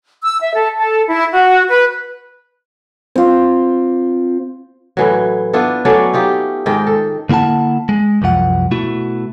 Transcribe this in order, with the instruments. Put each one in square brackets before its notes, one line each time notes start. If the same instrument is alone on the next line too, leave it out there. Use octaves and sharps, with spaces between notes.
[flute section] E6
E5
A4
A4
E4
F#4
B4
[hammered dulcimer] C4 F4 D6
[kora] A2 E3 F#3
B3 D4 E4 F4
F#3 A3 C#4 D5
D#4 F4 G4
G#2 D#3 A#4 G5
A4
[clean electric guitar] D3 A#3 E4 F#5 A5
G#3
C2 F#2 F3 F#5
B2 A3 E4 F#4